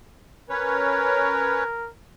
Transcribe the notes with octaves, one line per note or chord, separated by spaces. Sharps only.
C#4 A#4 B4 C#5